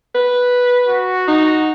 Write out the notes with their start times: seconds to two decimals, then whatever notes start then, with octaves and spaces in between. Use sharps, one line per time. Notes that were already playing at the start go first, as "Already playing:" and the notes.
0.15 B4
0.88 F#4
1.28 D#4